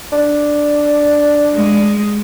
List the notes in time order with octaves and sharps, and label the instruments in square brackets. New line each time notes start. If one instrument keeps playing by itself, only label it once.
[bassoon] D4
[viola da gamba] G#3